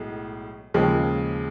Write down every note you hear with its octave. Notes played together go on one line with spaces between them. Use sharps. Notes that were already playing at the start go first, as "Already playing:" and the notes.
Already playing: B1 A2 G#3
D#2 C#3 F3 G#3